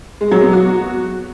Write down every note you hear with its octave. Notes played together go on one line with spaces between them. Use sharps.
G#3
F#3
B3
F#4